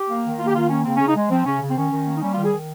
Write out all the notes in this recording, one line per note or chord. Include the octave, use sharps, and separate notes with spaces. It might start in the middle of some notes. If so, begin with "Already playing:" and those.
Already playing: G4
A#3
D#3
A#3 F4
G4
D#3 F4
A#3 C#4
C#3 C4
C#3 C#4
D#4
G#3
F3 C4
C#3 C#4
C#3
C4
D#3 C#4
D#3
A#3
D#4
G3 C#4
D#3 F4
G#4
D#3